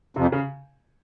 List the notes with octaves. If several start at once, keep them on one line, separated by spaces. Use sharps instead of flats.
F2 C3
C#3